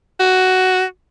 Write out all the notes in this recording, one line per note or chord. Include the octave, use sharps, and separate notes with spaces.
F#4